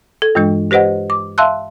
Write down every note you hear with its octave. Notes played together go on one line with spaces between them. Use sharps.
A4
G2 E3 G#3 D4
G4 B4 C5 D#5 F#5
D6
E5 F5 A5 C6 E6 F#6